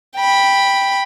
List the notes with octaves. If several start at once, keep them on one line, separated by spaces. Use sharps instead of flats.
G5 B5